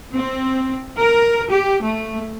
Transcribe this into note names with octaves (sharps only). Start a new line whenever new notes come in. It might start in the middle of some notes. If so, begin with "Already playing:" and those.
C4
A#4
G4
A3